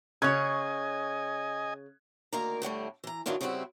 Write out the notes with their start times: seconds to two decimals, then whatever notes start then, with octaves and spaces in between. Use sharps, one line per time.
0.22 C#3 C#5 D#5 G#5 C#6 F#6 G#6
2.33 D2 D#3 A#3 A#4 D5 A#5
2.62 A2 D3 G3 A3
3.04 E3 A#5
3.26 F#2 D#3 E3 F#3 D4 F4
3.41 C#3 G3 B3 C4 E4 F#4